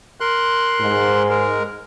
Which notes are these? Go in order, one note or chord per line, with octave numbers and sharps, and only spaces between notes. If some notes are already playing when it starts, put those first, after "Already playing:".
A#4 C6 F#6
G#2
G#3 A#4